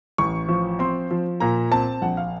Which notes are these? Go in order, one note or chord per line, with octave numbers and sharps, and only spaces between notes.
A1 C#6
F3
C4 C6
F3
A#2 A#5
C4 A5
A#1 F#5
F5